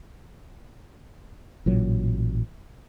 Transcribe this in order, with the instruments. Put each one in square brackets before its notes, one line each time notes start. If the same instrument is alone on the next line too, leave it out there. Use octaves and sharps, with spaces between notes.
[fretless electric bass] A1 A#2 F#3